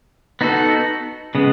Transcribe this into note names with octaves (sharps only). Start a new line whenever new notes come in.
B3 D#4 F#4 A4
C#3 G#3 B3